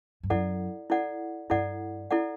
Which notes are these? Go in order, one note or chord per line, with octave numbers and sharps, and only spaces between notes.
G2
F#2 E4 A4 D5 F#5
E4 A4 D5 F#5
G2 E4 A4 D5 F#5
E4 A4 D5 F#5